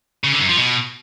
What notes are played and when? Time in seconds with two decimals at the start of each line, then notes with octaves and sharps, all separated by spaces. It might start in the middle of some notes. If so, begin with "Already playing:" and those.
0.24 C#3
0.32 D3
0.41 F#2
0.49 F3
0.58 B2